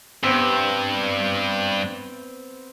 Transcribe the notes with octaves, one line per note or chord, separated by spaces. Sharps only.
G2 B3 C4